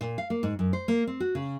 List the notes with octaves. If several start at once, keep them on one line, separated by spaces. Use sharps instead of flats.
A#2
F5
A#3
G#2
F#2
C5
A#3
C4
F#4
C#3